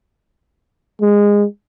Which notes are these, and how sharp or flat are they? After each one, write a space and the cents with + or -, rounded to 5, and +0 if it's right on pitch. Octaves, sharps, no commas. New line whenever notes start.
G#3 -20